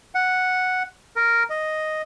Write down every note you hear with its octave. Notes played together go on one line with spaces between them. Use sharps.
F#5
A#4
D#5